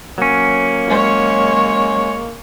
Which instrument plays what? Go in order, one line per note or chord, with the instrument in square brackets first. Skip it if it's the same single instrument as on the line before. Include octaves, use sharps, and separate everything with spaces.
[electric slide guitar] F#3 C#4 [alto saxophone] A#3
[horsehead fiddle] G#3 C#5